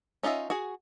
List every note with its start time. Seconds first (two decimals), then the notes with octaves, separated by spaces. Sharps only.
0.23 C#4 D#4 F4 D#5 E5
0.50 F#4 G#4